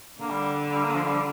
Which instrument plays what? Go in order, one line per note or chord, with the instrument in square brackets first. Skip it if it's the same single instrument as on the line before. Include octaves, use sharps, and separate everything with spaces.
[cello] D3 [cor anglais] A#3
[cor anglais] G3
G3
G3
A#3
F3
G3